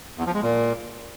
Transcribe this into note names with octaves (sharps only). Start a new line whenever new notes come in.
E2
F3
G#3
A#2